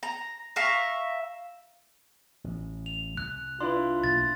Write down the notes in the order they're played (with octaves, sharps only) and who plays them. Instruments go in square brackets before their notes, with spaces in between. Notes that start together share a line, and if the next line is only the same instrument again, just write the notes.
[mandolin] A#5
E5 F5 A#5 C#6
[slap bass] A1
[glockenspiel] F7
[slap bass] C2 [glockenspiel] F#6
[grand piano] D4 E4 B4 [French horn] F4 [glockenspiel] C6
[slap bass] B1 A#3 [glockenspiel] A6